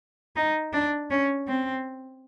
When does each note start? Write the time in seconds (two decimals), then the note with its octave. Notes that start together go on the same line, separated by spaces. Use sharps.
0.36 D#4
0.73 D4
1.10 C#4
1.48 C4